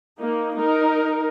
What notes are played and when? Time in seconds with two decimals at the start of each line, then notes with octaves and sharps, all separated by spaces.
0.20 A#3 D#4
0.59 D#4 A#4